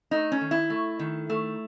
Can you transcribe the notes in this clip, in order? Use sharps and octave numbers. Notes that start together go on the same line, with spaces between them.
A3 D#4
C#4
D#3
E4
A3
D#3
A3